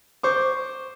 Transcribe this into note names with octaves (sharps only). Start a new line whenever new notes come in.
C5 C#6 D6